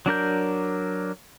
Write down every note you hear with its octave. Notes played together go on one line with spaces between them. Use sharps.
F#3 D4 A#4 G6